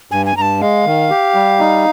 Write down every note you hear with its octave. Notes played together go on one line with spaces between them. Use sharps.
G2 G#5
G#5
G2 A#5
A5
G#3 F5
D#3
G4
G3
D#4